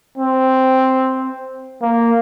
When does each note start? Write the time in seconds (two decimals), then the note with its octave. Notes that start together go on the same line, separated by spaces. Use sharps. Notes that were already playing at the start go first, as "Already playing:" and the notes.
0.17 C4
1.81 A#3